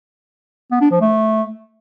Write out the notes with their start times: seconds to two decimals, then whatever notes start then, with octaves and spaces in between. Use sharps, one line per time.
0.71 B3
0.81 D4
0.91 F3
1.01 A3